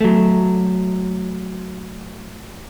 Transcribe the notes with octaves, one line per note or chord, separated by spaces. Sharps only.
F#3 A3